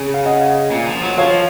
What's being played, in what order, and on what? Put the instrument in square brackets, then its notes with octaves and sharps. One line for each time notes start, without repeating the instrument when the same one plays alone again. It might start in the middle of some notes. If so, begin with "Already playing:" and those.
Already playing: [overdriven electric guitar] C#3
[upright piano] F5
D#5 F#5
[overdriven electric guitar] A#2
F3
F#3
[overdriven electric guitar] F3 [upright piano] C#5 F5